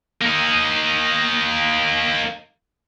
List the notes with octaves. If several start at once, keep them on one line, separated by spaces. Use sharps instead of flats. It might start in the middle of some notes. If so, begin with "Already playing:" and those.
A#3 D#4